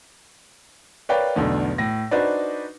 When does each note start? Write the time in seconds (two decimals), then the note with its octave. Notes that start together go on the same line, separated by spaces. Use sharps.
1.09 A#4 B4 C#5 D5 F5 G5
1.36 B1 E2 D3 A3
1.78 A2 A#6
2.11 D4 D#4 F#4 B4 C5 D5